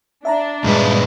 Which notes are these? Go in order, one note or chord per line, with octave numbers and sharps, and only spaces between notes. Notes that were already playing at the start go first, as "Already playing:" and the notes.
D4 E5 A5 A#5
G2 A#2 G#3 B4